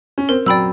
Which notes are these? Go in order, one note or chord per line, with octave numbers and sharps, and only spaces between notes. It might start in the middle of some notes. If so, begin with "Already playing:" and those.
C#4
C4 A#4
F#3 D5 G5 B5 E6